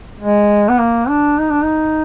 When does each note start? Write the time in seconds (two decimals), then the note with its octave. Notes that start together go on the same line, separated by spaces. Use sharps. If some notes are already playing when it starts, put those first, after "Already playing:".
0.19 G#3
0.69 B3
0.79 A#3
1.09 D4
1.39 D#4
1.50 D4
1.63 D#4